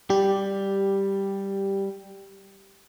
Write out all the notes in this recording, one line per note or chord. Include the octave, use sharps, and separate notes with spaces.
G3 G4